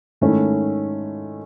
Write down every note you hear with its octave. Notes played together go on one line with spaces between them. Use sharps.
G#2 D#3 A3 C#4 E4